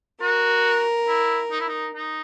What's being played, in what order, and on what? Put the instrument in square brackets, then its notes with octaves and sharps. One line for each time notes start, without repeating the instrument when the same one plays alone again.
[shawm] F#4 [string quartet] A#4
[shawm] E4
D#4
E4
D#4
D#4